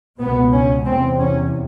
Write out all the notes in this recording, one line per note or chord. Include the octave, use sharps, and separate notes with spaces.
C#2 B2 B3
C#4
E2 C3 C4
C#4